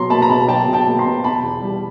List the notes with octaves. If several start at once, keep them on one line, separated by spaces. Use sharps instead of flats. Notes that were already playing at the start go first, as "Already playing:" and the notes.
Already playing: B2 F#3 A#5 C6
A#3 A5 B5
A#5
B2 A5 B5
F#3 G5 A5
B2
G5 A5
A#3
A#5 C6
B2
B2 A5 B5
E2
G3